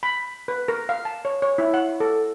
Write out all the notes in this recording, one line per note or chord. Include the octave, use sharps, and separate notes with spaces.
B5
B4
A#4
F5
A5
C#5
C#5
E4
F#5
A4